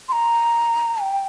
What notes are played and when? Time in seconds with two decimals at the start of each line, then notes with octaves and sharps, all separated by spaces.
0.09 C6
0.12 A#5
1.01 G5